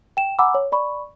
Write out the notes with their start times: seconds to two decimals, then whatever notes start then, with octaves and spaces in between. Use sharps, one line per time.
0.17 G5 E7
0.39 F#5 G#5 A#5 B5 D6 E6
0.54 C#5
0.72 D5 B5 C#6